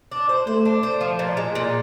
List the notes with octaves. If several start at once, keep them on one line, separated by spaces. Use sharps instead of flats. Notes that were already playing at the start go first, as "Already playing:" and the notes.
D4
C5
A3 C5
D4
C5
F3
A#2
G#3
A#2